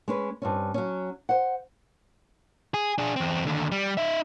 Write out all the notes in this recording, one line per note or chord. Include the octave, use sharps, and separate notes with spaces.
G#3 C#4 B4
G2 C4 C#4
F#3 C#4
C5 F#5
G#4
D4 G#4
E2 C4
D#2 D3
G3
D#4 E5